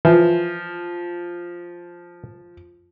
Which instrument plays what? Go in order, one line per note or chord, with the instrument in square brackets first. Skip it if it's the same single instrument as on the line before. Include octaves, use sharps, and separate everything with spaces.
[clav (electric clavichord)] E3 [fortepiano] F3